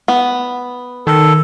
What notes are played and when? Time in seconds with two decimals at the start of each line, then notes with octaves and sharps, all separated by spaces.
0.08 B3
1.07 D#3 A4